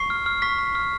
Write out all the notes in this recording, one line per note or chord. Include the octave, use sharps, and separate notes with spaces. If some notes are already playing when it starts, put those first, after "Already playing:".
Already playing: C#6 C7
F6
F6
C#6 B6
C#6
F6